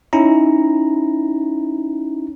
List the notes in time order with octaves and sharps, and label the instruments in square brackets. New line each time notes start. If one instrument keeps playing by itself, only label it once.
[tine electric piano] C#4 D#4 E4 A#5